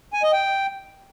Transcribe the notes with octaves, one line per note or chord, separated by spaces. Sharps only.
G#5
D#5
G5